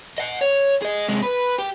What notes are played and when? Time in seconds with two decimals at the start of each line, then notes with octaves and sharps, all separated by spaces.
0.18 D#5 F#5
0.41 C#5
0.82 G#4 D#5
1.08 C3 G#3
1.22 B4
1.58 G4